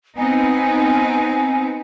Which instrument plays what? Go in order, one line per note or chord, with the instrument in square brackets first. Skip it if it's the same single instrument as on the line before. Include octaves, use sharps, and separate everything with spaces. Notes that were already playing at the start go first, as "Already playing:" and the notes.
[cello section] B3 C4 D#4 [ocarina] G#5